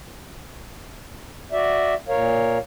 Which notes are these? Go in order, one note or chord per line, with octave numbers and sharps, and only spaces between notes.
F#4 D5 E5
A#2 A#4 C#5 F5